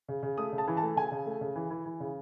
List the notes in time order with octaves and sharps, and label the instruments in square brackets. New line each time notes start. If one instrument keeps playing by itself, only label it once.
[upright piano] C#3
C#3
A3 D#6
C#3
A5
E3
A5
A3
C#3 G#5
C#3
A3
C#3
E3
E3
E3
C#3